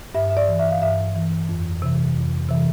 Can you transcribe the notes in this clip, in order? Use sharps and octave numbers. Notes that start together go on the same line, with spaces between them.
G2 E5
E5
D5
E3
E5
F5
G2 E5
E3
F2
C3 E3
F2
C3 E3